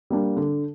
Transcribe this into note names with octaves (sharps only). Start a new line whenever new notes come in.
G3 A#3 D4
D3